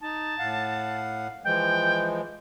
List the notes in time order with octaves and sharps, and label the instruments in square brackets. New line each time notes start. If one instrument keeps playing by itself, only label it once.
[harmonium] D#4 [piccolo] A5
[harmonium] A2 F5 F#5
[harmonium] E3 F3 G#3 [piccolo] G5